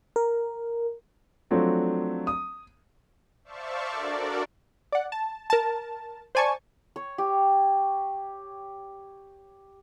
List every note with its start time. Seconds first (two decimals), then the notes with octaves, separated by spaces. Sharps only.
0.16 A#4
1.51 F3 F#3 A3 C4 D4
2.27 D#6
3.44 C5 D5 E5 F5 A5 C#6
3.89 D4 F#4 A4 A#4 D5
4.92 D5 F#5
5.12 A5
5.50 A#4 A5
6.35 C5 D5 G#5 A5 C#6
6.96 C#5
7.18 G4